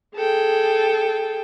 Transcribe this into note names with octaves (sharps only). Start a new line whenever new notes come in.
G#4 A4 G5